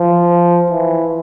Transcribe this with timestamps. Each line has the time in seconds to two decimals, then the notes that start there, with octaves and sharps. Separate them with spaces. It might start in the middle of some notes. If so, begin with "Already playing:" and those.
Already playing: F3
0.70 E3